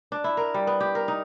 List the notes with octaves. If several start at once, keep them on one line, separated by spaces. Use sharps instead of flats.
D4
E4
A#4
G3
B3
G4
A#4
D#4